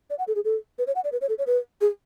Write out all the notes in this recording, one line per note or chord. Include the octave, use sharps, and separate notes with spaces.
D5
F#5
A4
G#4
A4
B4
C#5
F#5
D5
B4
C#5
A4
C#5
B4
G#4